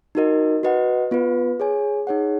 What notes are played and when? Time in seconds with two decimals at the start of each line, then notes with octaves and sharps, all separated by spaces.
0.15 D#4 F#4 A#4 D#5
0.63 F#4 B4 D#5 F#5
1.11 B3 F4 B4
1.60 G#4 C#5 G#5
2.07 D#4 G#4 C#5 F#5